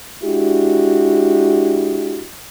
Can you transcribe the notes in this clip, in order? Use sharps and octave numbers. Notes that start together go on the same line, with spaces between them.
G#3 D4 E4 F#4 G4